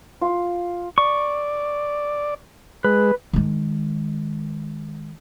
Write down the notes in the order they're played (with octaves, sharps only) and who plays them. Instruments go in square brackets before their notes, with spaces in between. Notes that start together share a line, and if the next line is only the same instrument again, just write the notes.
[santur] F4
[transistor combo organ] D5 [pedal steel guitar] C#6
[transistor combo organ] G#3 [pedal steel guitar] B4
[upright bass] D#3 G#3